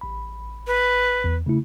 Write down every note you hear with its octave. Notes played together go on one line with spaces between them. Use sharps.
A1 B5
B4
E2
C#3 A3 E4